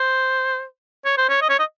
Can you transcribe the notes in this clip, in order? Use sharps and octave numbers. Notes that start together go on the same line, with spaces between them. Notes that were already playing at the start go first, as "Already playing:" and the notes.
Already playing: C5
C#5
C5
C#5
D#5
C#5
D#5